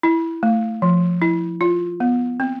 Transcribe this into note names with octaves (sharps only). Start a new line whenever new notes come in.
E4
A3
F3
E4
F4
B3
C4